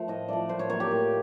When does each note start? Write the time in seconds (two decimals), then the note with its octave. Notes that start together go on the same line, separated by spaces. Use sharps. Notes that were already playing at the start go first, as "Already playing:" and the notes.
Already playing: F3 A3
0.08 A2 D#5
0.28 F3 A3 D5
0.49 A2 C5
0.59 C#5
0.70 F#3 A#3 C#5
0.80 G4
0.91 A2